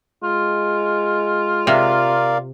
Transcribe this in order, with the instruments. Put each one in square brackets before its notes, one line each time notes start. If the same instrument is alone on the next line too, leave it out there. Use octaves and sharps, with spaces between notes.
[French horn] G#3 [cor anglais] F4
[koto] C3 [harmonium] A#4 D5 F5